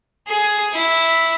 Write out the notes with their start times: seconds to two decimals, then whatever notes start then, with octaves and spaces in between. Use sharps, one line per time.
0.28 G#4
0.74 E4